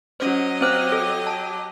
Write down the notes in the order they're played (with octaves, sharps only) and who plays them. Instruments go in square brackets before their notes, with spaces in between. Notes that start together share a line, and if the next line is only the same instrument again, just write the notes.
[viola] F#3 D#5 [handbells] C#4 C5
[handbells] C4 C5 F#6 [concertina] G4
[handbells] A4
A5